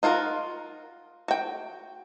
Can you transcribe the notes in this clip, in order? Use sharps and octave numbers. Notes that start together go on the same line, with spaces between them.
D#4 F4 F#4 A#4
F#4 G5